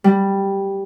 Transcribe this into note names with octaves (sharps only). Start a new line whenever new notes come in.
G3